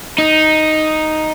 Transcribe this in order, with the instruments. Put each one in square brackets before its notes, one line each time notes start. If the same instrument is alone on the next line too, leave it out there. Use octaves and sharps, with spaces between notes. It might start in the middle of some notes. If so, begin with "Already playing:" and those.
[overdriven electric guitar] D#4